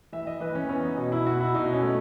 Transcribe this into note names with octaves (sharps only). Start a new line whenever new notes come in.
E3 E5
D#5
E3 B4
C#4
B3 C#4
D#4
B2
E4
B2 F#4
E4
B2 D#4
C#4
A3